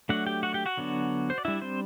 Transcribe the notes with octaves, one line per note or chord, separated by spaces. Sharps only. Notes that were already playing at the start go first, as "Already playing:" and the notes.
F#3 A3 D4 F#4 F#5
G4 G5
F#4 F#5
G4 G5
F#4 F#5
D3 F#3 B3 D4
C5
D5
G3 D4 E4 E5
C4 C5